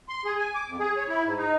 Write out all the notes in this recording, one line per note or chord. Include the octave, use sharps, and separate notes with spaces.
C6
G#4
G#5
D6
F2
G#4
C#5
E4
G#2
D#4